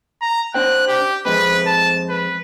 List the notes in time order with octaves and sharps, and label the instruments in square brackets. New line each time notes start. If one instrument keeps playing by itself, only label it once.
[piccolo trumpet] A#5
[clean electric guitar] D4 C5 G5 [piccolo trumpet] F#6
[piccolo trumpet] G4
[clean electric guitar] F2 G#3 C4 [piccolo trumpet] B4
[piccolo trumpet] A5
B4